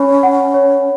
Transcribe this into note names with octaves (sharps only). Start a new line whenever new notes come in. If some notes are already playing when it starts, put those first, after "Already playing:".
Already playing: C#4 C#5 B5
F#5
C#5